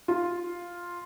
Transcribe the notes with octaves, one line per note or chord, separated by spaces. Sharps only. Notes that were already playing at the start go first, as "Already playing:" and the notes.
F4